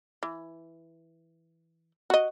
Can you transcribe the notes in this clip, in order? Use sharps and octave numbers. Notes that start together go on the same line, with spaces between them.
E3
F#4 D#5